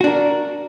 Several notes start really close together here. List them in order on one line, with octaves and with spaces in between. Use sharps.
F#4 D4 A#4